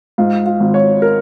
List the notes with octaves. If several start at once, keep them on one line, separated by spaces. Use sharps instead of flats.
G#2 F4
F4
G#1
C#5
A#4